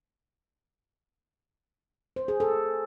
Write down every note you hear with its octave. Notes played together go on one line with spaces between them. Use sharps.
C5
G#4
A4